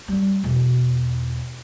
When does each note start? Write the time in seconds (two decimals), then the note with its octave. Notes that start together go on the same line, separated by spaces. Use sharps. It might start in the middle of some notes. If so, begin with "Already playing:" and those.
0.08 G3 C#4
0.44 E2 B2